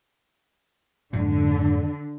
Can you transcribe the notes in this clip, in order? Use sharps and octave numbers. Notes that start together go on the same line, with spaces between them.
F2 G#2 D3 F#3